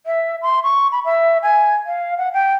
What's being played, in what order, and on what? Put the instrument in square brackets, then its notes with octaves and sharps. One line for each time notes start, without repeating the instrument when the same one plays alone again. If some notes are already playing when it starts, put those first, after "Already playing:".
[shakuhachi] E5
C6
C#6
B5
E5
G#5
F5
F#5
G5